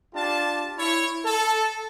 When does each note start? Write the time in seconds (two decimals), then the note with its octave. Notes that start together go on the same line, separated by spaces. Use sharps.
0.15 D4 F4 G4 A5
0.78 E4 C#5
1.25 A4